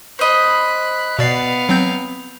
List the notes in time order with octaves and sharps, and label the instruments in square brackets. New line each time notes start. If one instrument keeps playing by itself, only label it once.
[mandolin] C5 D#5 [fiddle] B5 F#6
[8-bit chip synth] B2 D5 C7 [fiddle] B3 F5
[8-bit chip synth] F#3 C4 G6